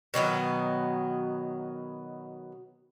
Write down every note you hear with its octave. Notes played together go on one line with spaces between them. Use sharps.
B2 D#3 F#3 B3